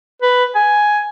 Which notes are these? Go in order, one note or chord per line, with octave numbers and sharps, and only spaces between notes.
B4
G#5